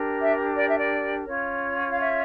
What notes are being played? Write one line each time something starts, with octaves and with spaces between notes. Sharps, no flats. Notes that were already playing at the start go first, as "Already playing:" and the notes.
Already playing: D4 G4 A#4
E5
D5
E5
D5
C#4 F4 C#5
F5
E5